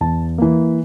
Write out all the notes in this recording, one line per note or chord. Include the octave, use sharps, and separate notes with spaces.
E2 A5
E3 A#3